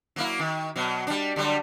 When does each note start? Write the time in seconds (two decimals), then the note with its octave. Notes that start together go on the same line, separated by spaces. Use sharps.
0.16 F#3 A#3 E4
0.39 D#3
0.76 B2 F#3
1.07 G3 D4
1.36 D3 F#3 G3